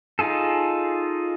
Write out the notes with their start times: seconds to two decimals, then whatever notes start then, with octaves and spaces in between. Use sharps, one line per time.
0.19 D#4 F4 G#4 A4